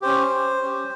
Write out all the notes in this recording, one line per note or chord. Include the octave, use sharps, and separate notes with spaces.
C#4 G4 C5
C#4 G4